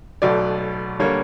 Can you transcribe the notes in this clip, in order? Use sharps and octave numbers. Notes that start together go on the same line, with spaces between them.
B1 B2 F#3 A3 D5
D3 G3 A#3 C#5